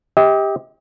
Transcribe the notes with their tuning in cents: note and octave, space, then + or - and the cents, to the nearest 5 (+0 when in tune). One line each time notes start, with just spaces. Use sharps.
G4 +15 D#5 +45